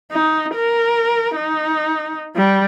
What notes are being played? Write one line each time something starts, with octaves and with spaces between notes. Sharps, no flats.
D#4
A#4
D#4
G3